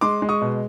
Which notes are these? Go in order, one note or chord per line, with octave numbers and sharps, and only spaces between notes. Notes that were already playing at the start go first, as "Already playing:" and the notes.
G#3 C6 D6
G#3
C#6 D#6
B2